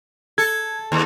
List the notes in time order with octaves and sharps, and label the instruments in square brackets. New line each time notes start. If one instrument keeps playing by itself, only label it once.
[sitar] A4 [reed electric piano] G#6
[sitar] D#2